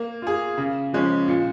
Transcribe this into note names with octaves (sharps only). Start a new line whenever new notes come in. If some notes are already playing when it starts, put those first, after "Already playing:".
Already playing: A#3
F4 G#4
C#3
F3 G#3 C#4
A#2